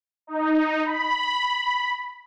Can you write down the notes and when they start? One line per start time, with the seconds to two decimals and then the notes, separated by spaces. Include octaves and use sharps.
0.27 D#4
0.84 B5